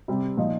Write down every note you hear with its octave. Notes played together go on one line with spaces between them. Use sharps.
C3 G3 C4 G4
A#2 F3 D#4